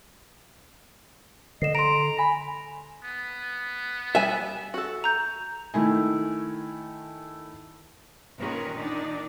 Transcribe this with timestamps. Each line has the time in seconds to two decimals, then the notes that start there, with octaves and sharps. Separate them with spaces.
1.62 D3 D#5 C7 E7
1.75 A#5 C6 D7
2.19 G#5 B5
3.04 B3
4.15 G3 E5 G#5
4.74 F#4 A4
5.04 A#5 G6
5.74 D#3 A3 E4 G#5
8.38 A#2 D#3 C#4 A#4 B4
8.77 D#3 D4 D#4